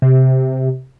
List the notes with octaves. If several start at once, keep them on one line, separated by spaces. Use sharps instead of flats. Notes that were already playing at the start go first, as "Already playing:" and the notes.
C3